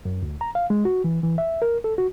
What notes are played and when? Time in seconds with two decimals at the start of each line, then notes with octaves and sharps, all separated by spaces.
0.05 F#2
0.22 D2
0.41 A#5
0.55 F5
0.70 G#3
0.85 F#4
1.04 E3
1.23 E3
1.38 E5
1.62 A#4
1.84 A4
1.98 F#4